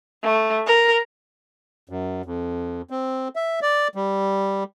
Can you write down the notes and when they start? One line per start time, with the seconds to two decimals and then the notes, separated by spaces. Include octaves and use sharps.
0.23 A3
0.67 A#4
1.89 F#2
2.25 F2
2.90 C4
3.36 E5
3.62 D5
3.95 G3